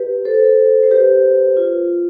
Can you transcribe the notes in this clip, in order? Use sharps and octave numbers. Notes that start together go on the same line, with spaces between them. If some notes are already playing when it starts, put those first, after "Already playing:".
Already playing: G4 B4
A4 C5
C5
G4 B4
F4